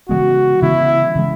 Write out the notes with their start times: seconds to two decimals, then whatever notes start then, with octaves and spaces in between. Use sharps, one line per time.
0.09 C#3 E3 G#3 B3 F#4
0.62 C#3 E3 G#3 B3 E4
1.15 C#3 E3 G#3